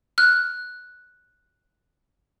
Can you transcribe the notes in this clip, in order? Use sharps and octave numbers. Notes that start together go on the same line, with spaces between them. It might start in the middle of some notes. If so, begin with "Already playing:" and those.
F6 F#6